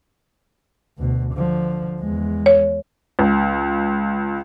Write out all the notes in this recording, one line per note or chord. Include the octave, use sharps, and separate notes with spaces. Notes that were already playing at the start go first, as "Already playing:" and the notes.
D2 B2
D3 F3
E2 G#3
C#5
C#2